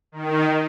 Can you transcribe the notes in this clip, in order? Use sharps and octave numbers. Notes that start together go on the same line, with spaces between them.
D#3